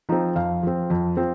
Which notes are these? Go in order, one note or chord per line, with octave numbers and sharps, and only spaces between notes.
F3 C4 D#4
F2 F5
F3 C4
F2
F3 C4